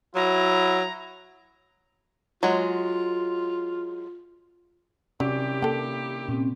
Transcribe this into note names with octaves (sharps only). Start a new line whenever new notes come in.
F#3 E4 A#5
F#3 G#3 F4
C3 D#3 F#3 C#4 E4 G4 D5
A#3 A4 G5
A#2 C4 C#4